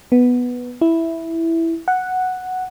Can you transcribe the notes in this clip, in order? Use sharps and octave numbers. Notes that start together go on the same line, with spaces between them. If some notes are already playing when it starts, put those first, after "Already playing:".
B3
E4
F#5